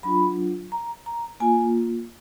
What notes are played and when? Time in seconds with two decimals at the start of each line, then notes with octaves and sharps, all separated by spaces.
0.03 F#3 D4 F4 B5
0.72 A#5
1.06 A#5
1.40 A#3 F4 G#5